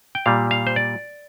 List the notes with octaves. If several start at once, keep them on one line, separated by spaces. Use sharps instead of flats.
G5
A#2 G3 F5
F5
C5
D5